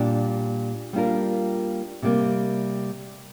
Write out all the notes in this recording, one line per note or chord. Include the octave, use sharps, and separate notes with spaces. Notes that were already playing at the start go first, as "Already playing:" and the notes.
Already playing: A#2 G3 D4 G4
G3 A#3 D4 F4 A#4
C3 G3 A#3